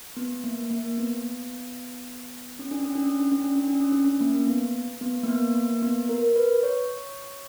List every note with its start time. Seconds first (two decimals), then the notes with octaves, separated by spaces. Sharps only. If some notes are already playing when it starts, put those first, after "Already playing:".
0.17 B3
0.44 A#3
0.71 A#3
0.98 B3
2.59 C#4
2.71 D4
2.83 C#4
2.95 D4
3.07 C#4
3.20 D4
3.32 C#4
3.44 D4
3.56 C#4
3.68 D4
3.80 C#4
3.92 D4
4.04 C#4
4.21 A#3
4.48 B3
5.01 B3
5.24 A#3
5.28 B3
5.55 A#3
5.82 B3
6.09 A#4
6.36 B4
6.63 C#5